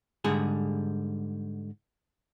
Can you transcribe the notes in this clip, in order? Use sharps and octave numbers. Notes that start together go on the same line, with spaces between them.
G#2 D3 G3 G#4